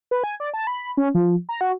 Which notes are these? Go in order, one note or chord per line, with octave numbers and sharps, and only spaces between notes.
B4
G#5
D5
A5
B5
C#4
F3
A#5
F#4